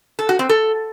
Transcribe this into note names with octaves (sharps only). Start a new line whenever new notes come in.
A4
F#4
C4
A4